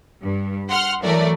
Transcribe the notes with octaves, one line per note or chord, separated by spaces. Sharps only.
G2
F#5 C6 F6
E3 F#3 A3 A#4 D5